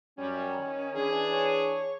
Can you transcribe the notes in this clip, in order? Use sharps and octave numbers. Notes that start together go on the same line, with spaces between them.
F#2 G3 C#4
D#3
E3 D4 G#4
C#5